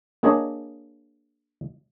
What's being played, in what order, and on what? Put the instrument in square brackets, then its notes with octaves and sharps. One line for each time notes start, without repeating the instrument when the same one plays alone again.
[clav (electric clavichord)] A#3 D4 G#4 C#5 D#5